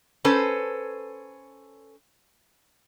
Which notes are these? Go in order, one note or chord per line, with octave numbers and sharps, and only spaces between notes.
C#4 A4 B4 C5